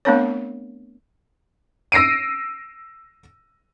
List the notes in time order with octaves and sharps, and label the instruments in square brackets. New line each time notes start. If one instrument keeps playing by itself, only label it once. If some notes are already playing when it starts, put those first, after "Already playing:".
[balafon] A3 B3 C4 D4 A#4 C#5
[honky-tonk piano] E6 A#6 C7 D7 D#7